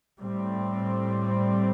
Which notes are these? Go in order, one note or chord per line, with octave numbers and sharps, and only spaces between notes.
A2 G3 C4